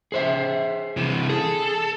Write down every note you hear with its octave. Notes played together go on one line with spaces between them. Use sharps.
G#4 C5 E5
C3 E3
G#4 A4